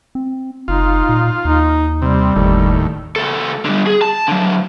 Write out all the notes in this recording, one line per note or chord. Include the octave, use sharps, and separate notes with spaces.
C4
F#1 D#4 F4
A#2
D#2 D#4
C3 G3
F#1 D#2 A2
C#2 A4
D3 G3
G#4
A5
D3 F#3